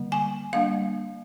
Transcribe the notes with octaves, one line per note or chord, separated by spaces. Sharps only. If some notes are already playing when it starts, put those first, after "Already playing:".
Already playing: D3 G3 A#3
G#5
G3 A#3 D4 F5